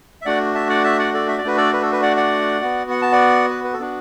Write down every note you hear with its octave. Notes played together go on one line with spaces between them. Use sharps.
E5
A3 D4 F#4 D5 F#5
E5 A5
D5 F#5
E5 A5
D5 F#5
A4 D5
E5
D5
A3 D4 F#4 B4
A4 D5
B4
A4
B4
D5 F#5
D5 F#5
B3 F#4
F#5
A5
D5 F#5
B4
B4
A4
B3 D4 F#4